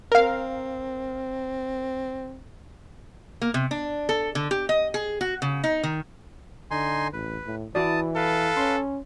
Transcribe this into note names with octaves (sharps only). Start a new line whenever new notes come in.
C4 A#4 F5
A#3
C3
D4
A4
D3
G4
D#5
G#4
F#4
C#3
D#4
D#3
D3 D#4 G#5 C6
A1 B4
A2
E3 E4 F#4 D5 A5 D#6
A4 B4 F5
C#4 C6